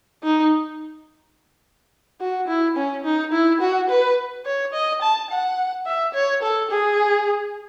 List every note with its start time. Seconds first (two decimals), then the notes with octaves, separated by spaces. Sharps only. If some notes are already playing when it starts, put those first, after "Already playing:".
0.24 D#4
2.21 F#4
2.48 E4
2.77 C#4
3.04 D#4
3.32 E4
3.61 F#4
3.90 B4
4.46 C#5
4.73 D#5
5.02 A5
5.30 F#5
5.86 E5
6.14 C#5
6.42 A4
6.71 G#4